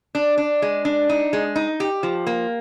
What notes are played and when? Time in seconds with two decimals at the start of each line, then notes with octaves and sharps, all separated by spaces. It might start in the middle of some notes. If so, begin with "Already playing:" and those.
0.15 D4
0.37 D4
0.62 G#3
0.85 D4
1.09 D#4
1.33 G#3
1.56 D#4
1.80 G4
2.03 F3
2.27 A#3